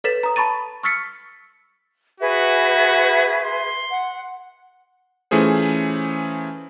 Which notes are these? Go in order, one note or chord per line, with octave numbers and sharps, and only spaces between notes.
A4 B4 C#5 A6 B6 E7
A#5 D#6
A5 B5 C#6 A6 D#7
C#6 E6 F6 A6 B6 C#7
F#4 G#4 B4 E5
C6
F#5
E3 A3 C#4 F4 G#4 C5